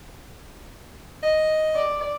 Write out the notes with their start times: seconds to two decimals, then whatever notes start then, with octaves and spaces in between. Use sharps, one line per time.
1.23 D#5
1.75 D5